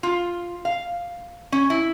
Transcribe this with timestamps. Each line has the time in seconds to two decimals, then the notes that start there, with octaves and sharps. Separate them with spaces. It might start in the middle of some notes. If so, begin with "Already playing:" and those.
0.03 F4
0.65 F5
1.52 C#4
1.70 E4